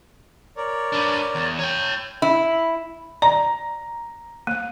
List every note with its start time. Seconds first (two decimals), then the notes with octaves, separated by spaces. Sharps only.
0.56 A#4 C#5 D5
0.93 D4 B4
1.35 E2
1.59 C#5 G5
2.22 E4
3.22 D5 A#5
4.47 A#3